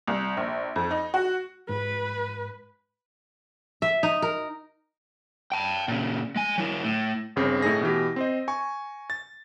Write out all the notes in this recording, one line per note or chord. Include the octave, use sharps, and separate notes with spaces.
C2
A#1
F2
D#4
F#4
G#2 B4
E5
D#4
A#4
G5 A5
A#2 C#3
G#3 G#5
F#3 E4
A2
G1 C#3 C4
A2 A3 D#4 G#4 A#6
B2 E3 G4
C4 C5 D#5
G#5 C#6
A6